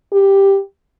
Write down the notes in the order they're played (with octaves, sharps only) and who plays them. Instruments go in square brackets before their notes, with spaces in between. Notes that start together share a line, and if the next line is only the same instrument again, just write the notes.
[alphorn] G4